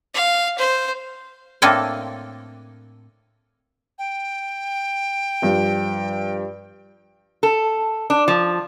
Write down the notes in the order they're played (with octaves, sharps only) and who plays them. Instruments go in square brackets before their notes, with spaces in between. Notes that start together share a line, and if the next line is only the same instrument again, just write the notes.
[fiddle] F5
C5
[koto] A2 A#3 C4 D4 A4 G#5
[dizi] G5
[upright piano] G2 F3
[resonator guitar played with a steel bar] A4
D4
F3